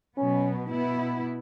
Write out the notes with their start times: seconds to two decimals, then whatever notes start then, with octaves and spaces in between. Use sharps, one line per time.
0.17 B2 F#3 B3 C#4
0.71 B2 B3 E4